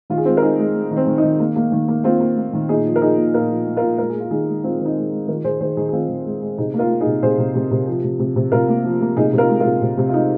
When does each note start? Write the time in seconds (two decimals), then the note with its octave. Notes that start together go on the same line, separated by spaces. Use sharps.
0.10 D#3 F4
0.18 G#4
0.25 G#3 C4 F4
0.37 A#4
0.42 G#3 D#4 G#4
0.59 G#3
0.75 G#3
0.91 D#3 D#4
0.97 C4
1.07 D#3
1.18 D#4
1.23 D#3
1.40 A#3
1.56 A#3
1.72 D#3
1.88 A#3
2.04 A#3 C4 F4
2.20 A#3
2.37 A#3
2.53 D#3
2.69 A#2 D#4 G#4
2.86 F3
2.96 A#4
3.02 F3 D#4 G#4
3.18 A#2
3.34 A#2 F4 A#4
3.50 F3
3.66 A#3
3.77 F4 A#4
3.83 A#2
3.98 G#3 A#4
4.10 G#3 G#4
4.20 F4
4.30 D#3 D#4 G#4
4.47 G#3
4.63 G#3 C4 F4
4.80 D#3 C4
4.85 D#4
4.96 G#3
5.12 G#3
5.28 D#3 F4 A#4
5.44 D#3 G#4 C5
5.60 D#3 G#4 C5
5.77 D#3 D#4 G#4
5.89 G#4
5.93 D#3 C4 F4
6.09 D#3
6.25 G#3
6.42 G#3
6.58 C3 D#4 G#4
6.74 A#3
6.79 F4 A#4
6.91 A#3
7.01 D#4 G#4
7.06 C3
7.23 C3 G#4 C5
7.38 C3
7.55 C3
7.71 C3
7.87 F3
8.03 C3
8.19 C3
8.36 C3
8.52 C3 F4 A#4
8.68 A#3
8.84 F3
9.01 A#3
9.17 C3 D#4 G#4
9.33 C3
9.38 F4 A#4
9.49 G#3
9.60 F4 A#4
9.65 C3
9.82 C3
9.98 C3
10.09 F4
10.14 G#3 D#4